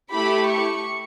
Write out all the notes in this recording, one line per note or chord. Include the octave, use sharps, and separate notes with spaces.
A3 E4 G4 B5
C#6